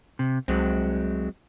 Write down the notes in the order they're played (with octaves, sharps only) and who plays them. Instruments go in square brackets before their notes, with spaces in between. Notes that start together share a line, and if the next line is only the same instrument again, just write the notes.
[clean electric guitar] C3
[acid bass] C2 [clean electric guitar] F#3 G#3 C4